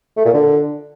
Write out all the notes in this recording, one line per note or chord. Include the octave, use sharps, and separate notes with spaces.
A3
A#2
D3